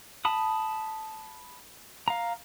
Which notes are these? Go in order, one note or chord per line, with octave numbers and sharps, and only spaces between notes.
A5 B5 D#6
F5 A#5